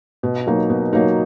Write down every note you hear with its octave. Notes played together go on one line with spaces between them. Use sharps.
B2
F#3 A#3 D#4
B2
F#3 A#3 D#4